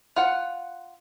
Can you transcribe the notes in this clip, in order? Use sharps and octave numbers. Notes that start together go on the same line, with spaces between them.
F4 F#5